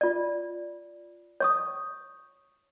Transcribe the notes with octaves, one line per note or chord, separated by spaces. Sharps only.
F4 D5
C#5 C#6 D#6